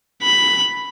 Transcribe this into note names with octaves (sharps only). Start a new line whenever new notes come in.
B5